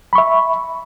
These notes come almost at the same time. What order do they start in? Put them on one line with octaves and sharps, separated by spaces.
B5 C#6 E5